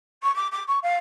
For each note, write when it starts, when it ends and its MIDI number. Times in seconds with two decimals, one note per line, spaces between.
0.23 0.33 85
0.35 0.47 86
0.52 0.63 86
0.67 0.79 85
0.83 0.96 77